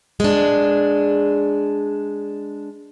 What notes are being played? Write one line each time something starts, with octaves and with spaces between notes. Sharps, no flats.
G#3 D4